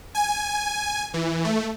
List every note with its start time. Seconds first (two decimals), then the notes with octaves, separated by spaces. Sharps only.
0.15 G#5
1.14 E3
1.44 A3